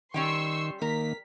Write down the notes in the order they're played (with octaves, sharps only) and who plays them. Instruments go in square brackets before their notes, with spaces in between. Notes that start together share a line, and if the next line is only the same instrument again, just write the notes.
[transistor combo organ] D#3 [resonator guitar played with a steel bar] G3 C#4 G5 [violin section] C6 C#6 E6
[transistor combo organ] D#3 A#3 [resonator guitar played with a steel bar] A#4 [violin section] B6